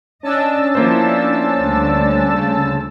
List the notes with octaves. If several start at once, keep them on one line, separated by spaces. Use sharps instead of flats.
C#4 D4 D#5 A5 E6
F3 A#3 B3 E4 C5
D2 D3 G3
C#3